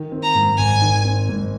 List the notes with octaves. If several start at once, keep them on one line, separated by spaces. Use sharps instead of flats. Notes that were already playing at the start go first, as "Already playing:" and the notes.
Already playing: D#3
C4
A#5
G#2
G#1 G#5
D#3
C4
G#2